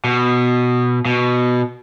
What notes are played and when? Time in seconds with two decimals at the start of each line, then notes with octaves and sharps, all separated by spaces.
0.04 B2
1.05 B2